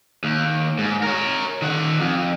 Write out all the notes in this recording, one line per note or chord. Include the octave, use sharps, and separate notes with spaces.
D#2
G#2
A#4 C#5
D#3 F#5
F2